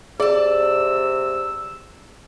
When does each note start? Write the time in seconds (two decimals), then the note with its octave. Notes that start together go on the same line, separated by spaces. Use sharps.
0.20 C3 G#4 D5 A5 E6